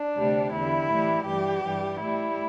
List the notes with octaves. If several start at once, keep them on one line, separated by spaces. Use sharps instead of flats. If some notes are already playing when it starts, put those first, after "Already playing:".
Already playing: D4
D2 C3 G3
E2 D3 G3 E4
A2 E3 G3
G2 E3 G3 G4
G2 E3 G3
A2 G3 E4